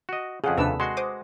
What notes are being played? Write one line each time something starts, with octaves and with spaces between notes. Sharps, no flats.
F#4 D#5
F2 C#3 G#4 F#5
D#2 C3 D4 A4 B4 E6
G#3 F#4 C6
C5 D6 D#6